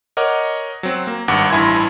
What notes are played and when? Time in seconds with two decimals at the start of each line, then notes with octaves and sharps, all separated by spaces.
0.17 A#4 C#5 D#5 F#5 D6
0.83 F#3 C4
1.07 A#3
1.28 G#1 G2 F#5 D6
1.50 A1 G2 E4 G#5 C6 G#6